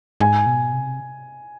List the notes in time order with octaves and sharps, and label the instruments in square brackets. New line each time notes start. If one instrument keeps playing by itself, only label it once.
[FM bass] G#2 [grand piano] G#5
[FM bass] B2
C3